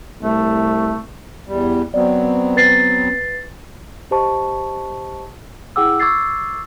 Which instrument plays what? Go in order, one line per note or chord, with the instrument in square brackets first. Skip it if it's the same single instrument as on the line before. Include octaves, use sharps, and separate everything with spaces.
[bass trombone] C2 [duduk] A3
[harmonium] E2 G3
[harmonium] F#3 B3 C4 [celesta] D5
[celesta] B4 A6 C7
G4 C5 D#5 A5 C#6
E4 G#4 F#5 G5 D6 E6
C#6 D6 E6 G#6 A6 C7